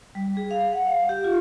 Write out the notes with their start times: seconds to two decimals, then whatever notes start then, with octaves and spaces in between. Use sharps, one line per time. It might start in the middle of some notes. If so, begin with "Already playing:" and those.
0.15 G3
0.37 G#4
0.51 F5
0.73 F#5
0.87 F5
1.09 G4
1.24 F4